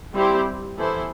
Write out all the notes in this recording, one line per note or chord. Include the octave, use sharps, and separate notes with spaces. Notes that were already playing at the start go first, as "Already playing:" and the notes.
G3 C4 E4 G4 C5
E3 B3 E4 A4 C5